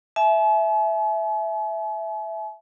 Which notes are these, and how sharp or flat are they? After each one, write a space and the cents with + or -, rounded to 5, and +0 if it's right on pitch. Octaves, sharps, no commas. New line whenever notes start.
E5 +0 G#5 +45